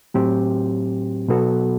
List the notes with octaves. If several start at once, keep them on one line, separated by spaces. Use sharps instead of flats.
A2 F#3 C4 G4
B2 F#3 B3 F#4 A4